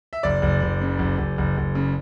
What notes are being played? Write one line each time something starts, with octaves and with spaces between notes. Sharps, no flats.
E5
F#1 D5
F#1
F#1
C#3
F#1
F#1
F#1
F#1
C#3